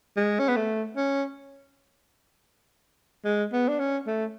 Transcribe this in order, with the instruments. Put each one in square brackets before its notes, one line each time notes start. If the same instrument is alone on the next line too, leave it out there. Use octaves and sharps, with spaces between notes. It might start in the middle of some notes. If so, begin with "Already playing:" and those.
[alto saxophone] G#3
C#4
B3
A3
C#4
G#3
B3
D4
C#4
A3